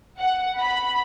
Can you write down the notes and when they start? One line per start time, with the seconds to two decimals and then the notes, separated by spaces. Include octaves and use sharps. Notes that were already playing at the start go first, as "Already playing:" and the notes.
0.19 F#5
0.60 B5